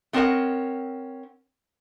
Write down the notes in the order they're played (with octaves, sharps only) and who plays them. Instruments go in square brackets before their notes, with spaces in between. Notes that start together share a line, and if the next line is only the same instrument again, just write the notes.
[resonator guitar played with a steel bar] A3 C4 C#4 A#4 D#5 F#5